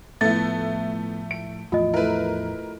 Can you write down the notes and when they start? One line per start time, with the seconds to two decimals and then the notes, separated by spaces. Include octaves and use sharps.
0.21 A2 F3 A3 B3 E4 A6
1.31 D7
1.72 E2 A2 F3 F4 D#5
1.94 A3 E4 A#4 B4